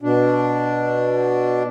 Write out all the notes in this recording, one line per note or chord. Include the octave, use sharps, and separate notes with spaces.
B2 D4